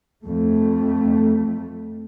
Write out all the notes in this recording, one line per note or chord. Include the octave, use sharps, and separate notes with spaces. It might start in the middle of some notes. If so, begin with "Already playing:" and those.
F2 A3